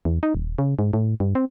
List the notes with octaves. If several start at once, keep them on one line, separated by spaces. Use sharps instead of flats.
E2
D#4
D#1
C#3
G#2
A2
G2
C4